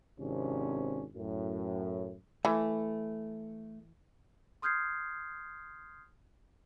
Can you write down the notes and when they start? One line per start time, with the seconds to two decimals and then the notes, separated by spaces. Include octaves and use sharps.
0.19 G#1 C3 C#4 D4
1.14 F#2 A2
2.45 E3 A3
4.62 C6 D#6 F6 G6 G#6 C7